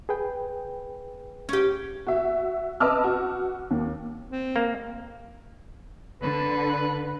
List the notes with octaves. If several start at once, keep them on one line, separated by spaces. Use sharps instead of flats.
G#4 B4 G5
C#4 G4
F#4 E5
B4 D#5 A5 D6 E6 F6
F#4
D#2
C4
A#3
D3 B4